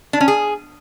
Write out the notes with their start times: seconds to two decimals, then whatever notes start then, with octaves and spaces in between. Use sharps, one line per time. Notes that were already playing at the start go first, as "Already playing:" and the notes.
0.13 D4
0.21 C#4
0.28 G#4